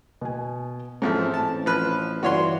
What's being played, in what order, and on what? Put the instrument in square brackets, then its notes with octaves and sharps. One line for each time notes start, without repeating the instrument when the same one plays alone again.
[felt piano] B2 G#5
[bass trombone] E2 [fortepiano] G#2 F3 A3 [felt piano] C4 C#4
[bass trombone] A1 [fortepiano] A5
[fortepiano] F3 B4 F#6
[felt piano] G1 D5 [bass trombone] E3 [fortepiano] F#4 C#5 C6